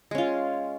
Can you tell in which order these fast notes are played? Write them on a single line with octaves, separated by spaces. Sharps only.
G#3 C#4 F4